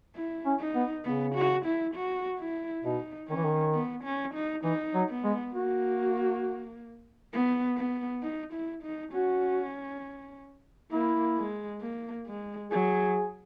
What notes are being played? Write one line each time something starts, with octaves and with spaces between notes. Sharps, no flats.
E4
C#4
D#4
B3
C#3 B3
F#4
E4
F#4
E4
B2 D#4
D#3 C#4
E3
D#3
B3
C#4
D#4
E3 D#4
F#3
B3
G#3
A#3 F#4
B3
B3
D#4
E4
D#4
C#4 F#4
A#3 E4
G#3
A#3
G#3
F#3 G#4